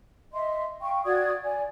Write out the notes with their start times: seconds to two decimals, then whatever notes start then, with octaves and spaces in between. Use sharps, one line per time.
0.33 D#5 E5 C6
0.82 F5 G5 C#6
1.05 F#4 D5 D#6 G#6
1.45 D5 G#5